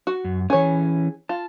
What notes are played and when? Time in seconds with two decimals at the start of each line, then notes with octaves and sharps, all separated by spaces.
0.07 F#4
0.24 F#2
0.50 E3 C#4 G#4 C#5
1.29 F4 A5